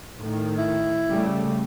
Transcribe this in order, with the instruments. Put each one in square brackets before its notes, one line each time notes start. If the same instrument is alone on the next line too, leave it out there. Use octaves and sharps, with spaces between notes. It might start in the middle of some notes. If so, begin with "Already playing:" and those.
[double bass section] A2 D#3
[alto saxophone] E4
[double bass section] C#3 G3 A3